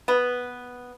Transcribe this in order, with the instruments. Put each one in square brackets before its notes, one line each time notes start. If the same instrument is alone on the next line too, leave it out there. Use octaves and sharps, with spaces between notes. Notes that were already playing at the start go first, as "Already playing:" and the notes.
[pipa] B3